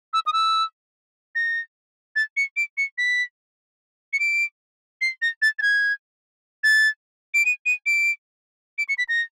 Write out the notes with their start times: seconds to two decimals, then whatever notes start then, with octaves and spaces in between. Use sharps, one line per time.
0.13 E6
0.26 D#6
0.33 E6
1.35 A#6
2.16 A6
2.37 C#7
2.56 D7
2.77 C#7
2.98 B6
4.13 C#7
4.19 D7
5.01 C7
5.22 A#6
5.42 A6
5.59 A6
5.62 G#6
6.64 A6
7.34 D7
7.45 D#7
7.66 D#7
7.86 D7
8.78 D7
8.89 C#7
8.98 B6
9.09 A#6